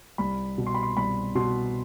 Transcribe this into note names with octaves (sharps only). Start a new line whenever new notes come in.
C2 B5
B2
C6
B5
C6
C2 B5
B2 C6